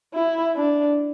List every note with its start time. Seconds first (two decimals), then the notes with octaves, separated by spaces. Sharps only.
0.14 E4
0.55 D4